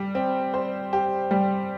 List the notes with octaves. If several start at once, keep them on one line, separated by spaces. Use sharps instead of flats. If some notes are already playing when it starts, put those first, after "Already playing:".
Already playing: G3 G4
C4
C5
G4
G3